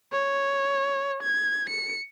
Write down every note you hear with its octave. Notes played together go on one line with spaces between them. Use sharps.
C#5
G#6
C#7